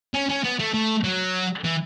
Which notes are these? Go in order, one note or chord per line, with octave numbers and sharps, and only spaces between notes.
C#4
C#4
B3
A3
A3
F#3
E3